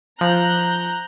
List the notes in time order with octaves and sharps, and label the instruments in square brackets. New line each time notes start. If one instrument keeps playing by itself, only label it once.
[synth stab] F3 [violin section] A#5 F#6 G6